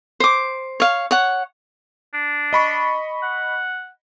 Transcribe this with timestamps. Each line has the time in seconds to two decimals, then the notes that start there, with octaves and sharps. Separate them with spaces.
0.20 C5 D6
0.80 C#5 F5
1.11 C#5 F#5
2.14 D4
2.53 D#5 B5 C#6
3.23 F#5